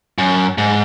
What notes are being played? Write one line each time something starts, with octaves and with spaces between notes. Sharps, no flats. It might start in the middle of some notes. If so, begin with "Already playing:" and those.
F#2
G#2